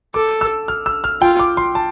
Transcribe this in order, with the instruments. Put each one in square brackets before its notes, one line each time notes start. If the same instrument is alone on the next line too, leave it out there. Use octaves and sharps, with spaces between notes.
[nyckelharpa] A4 [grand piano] D6
[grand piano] E6
F6
E6
F6
[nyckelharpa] F4 [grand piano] G5
[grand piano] D6
C6
A5